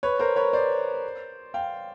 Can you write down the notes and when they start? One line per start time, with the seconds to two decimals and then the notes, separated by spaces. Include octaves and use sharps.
0.03 B4 C#5
0.19 A#4 C5
0.36 B4 C#5
0.53 C5 D5
1.54 F5 G5